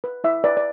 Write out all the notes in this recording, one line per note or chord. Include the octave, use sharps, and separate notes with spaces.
B4
E4 E5
B4 D5
D5